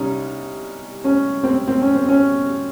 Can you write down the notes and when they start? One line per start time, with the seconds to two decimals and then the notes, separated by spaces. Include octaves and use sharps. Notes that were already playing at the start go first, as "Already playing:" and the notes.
Already playing: C2 G3 C#4 D#4
1.04 C#4
1.43 C4
1.67 C4
1.82 C#4
1.95 C4
2.08 C#4